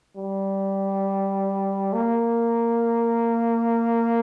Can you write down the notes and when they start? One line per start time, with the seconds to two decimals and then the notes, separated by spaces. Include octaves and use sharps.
0.16 G3
1.93 A#3